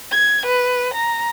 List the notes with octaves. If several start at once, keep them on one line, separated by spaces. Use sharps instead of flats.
G#6
B4
A#5